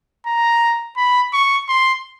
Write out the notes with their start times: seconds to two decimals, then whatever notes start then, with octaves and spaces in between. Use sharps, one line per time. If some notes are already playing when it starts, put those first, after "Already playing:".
0.26 A#5
0.97 B5
1.33 C#6
1.68 C6